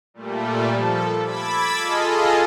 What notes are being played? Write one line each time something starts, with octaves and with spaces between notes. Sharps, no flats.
A#2 G3 A3
F3 A4
B5 D6 E6 G#6 A6 B6
F4 G#4 A4 D#5